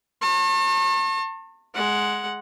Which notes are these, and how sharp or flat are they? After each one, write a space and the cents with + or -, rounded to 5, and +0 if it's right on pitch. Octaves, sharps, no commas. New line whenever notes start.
A5 +40 C#6 -40
G#3 +10 F#5 +0